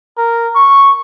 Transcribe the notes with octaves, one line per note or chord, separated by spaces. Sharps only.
A#4
C#6